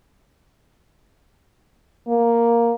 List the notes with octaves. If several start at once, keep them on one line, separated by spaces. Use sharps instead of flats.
A#3